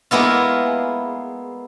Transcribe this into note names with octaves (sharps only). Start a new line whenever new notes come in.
G#3 A#3 B3 E4 F4